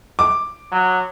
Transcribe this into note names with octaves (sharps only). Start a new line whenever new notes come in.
D6
F#3